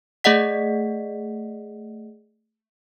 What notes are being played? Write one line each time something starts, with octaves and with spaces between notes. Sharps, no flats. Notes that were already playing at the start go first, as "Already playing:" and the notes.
A3 G#4 D5 D#5 F#5 B6